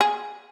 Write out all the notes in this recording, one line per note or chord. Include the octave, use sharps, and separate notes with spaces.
G#4